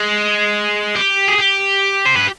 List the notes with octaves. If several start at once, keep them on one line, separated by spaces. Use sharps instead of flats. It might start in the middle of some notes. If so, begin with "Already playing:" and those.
Already playing: G#3
G4
G#4
G4
C5
B4